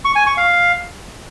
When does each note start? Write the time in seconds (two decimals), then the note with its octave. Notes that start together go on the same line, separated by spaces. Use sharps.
0.05 C#6
0.16 G#5
0.26 C#6
0.37 F5